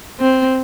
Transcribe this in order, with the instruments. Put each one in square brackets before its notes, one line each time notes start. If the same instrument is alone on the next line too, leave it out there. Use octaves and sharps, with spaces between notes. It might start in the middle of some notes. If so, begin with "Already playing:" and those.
[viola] C4